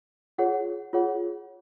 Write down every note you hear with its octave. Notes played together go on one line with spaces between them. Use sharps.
F4 G#4 C#5 F#5
F4 G#4 C#5 F#5